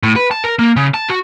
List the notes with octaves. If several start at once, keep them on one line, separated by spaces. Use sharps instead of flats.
A2
B4
A5
A#4
A#3
C#3
A5
F#4